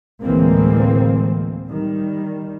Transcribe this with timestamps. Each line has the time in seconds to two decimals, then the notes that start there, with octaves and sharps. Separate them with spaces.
0.22 D2 A2 E3 G#3 A#3 C4
1.68 D#3 G3